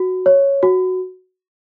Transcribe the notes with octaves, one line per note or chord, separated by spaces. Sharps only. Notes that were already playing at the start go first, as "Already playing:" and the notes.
Already playing: F#4
C#5
F#4